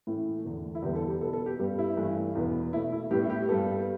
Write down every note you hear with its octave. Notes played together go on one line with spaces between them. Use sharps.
A2 E3 A3 E4
E2 D3 A3
E4
E2 D3 G3 B3 G4
A4
G4
B2 B3 A4
A4
G4
G2 G3 B3 G4
E4
G2 E3 A3
E2 B2 B3
B2 A3 E4
E4
A2 G3 B3 G4
E4
G4
G2 G3 B3 A4